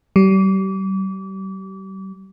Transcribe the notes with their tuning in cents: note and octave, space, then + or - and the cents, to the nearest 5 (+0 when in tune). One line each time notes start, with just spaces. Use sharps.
G3 -35